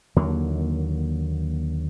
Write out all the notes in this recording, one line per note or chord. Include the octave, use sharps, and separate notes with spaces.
D#2 D3 F#3 A#3